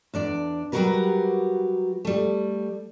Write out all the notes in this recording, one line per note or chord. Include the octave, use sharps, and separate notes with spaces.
E2 D4 D5
F#3 G3 F#4 G4 A#4 B4
G3 A3